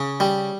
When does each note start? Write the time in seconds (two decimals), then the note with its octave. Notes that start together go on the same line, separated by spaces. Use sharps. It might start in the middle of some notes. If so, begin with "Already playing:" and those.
Already playing: C#3
0.20 G3